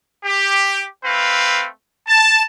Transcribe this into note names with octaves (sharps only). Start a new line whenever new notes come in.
G4
A3 C4 B4 F5
A5